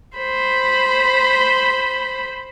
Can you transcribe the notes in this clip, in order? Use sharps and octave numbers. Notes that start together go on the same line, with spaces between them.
C5 B5